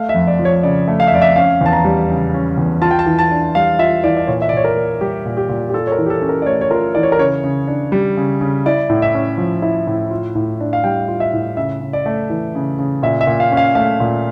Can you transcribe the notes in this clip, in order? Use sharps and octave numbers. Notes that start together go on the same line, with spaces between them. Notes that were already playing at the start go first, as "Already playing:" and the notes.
Already playing: A3 F5
E5
F2
D5
F3
C#5
C#3 D5
A3
F5
E5
F2 D5
E5
C#4 F5
E2 A5
A#5
G3
C#3
C#4
E2
F4 A5
G5
A5
E3
A5
D4
G3 F5
F4 E5
E3 D5
D5
A#2 C#5
E5
D5
A#2 C#5
A#4
A#3
G3 G4
A#2
G4
A#2
G4
F4 A4
C#5
A#4
E3
G4
A4
C#4
A#4
D5
A3 C#5
C#5
F4 A#4
E3 D5
C#5
A#4
C#3 C#5
C#3
D4
G3
C#3
C#3
E4 D5
A2
E5
C#4
F3
E4
A2
F4
A2
D4
F5
G3 G5
F4
E5
A2
C#3 E5
C#3
D5
A3
E3
C#3
C#3
A#2 E5
E5
A#2
F5
C#4
F5
A3 F5
A#2